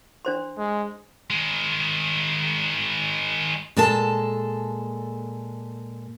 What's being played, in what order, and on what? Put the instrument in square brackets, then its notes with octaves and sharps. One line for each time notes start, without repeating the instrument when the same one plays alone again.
[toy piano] D4 C5 C6
[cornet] G#3
[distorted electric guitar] D#3 G#3
[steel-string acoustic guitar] A#2 G#3 A4 A5